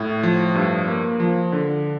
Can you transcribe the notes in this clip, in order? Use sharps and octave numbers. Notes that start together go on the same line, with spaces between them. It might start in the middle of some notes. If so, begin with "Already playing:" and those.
Already playing: A2
F3
G2
A#3
F3
D3